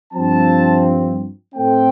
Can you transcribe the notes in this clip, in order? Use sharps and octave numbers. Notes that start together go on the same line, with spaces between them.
G2 F3 C4 A5
A2 A3 C4 G5